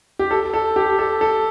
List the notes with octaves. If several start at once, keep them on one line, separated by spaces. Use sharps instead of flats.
G4
A4
A4
G4
A4
A4